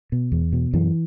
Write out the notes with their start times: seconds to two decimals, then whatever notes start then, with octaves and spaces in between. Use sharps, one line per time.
0.12 B2
0.32 E2
0.52 B2
0.73 F#2 E3